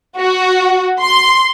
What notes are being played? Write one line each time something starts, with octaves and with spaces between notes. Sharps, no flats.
F#4
C6